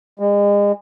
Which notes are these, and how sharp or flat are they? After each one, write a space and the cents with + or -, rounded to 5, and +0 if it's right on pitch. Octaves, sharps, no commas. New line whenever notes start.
G#3 -35